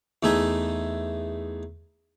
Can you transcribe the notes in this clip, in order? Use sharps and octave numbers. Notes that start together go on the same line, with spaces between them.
E2 A3 D#4 E5 G#5